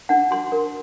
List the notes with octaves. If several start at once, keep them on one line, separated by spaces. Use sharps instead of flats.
D4 F#5
F#4 C6
A#4